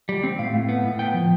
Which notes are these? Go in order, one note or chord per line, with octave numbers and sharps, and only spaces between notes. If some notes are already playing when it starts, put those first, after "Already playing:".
G3
C4
A2 F5
A2
B3
A2
B3 G5
F3